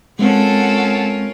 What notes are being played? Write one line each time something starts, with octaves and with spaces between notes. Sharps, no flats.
G#3 C4 C#4 F4 A4 A#4 F#5